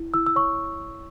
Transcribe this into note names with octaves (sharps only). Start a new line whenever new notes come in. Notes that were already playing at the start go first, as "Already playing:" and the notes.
Already playing: E4
E4 E6
E6
C#5 C#6